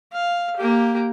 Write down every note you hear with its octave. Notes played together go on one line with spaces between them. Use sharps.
F5
A#3 G4